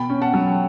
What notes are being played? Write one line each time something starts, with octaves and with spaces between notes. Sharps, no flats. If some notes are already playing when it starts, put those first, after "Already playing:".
Already playing: B2 G5 B5
C#4
F#5 A5
F#3